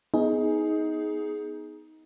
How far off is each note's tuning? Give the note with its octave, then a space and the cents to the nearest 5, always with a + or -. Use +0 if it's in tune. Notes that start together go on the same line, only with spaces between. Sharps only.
B3 +0 D#4 +20 G#4 +10